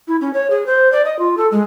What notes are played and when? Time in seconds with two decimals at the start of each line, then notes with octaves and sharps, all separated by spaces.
0.08 E4
0.21 C#4
0.33 C#5
0.50 G#4
0.66 C5
0.92 D5
1.05 D#5
1.19 F4
1.37 A4
1.52 G#3